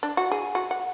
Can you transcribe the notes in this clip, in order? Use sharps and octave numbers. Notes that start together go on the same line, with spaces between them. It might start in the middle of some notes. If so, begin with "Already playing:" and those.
D4
F#4
G#4
F#4
F#5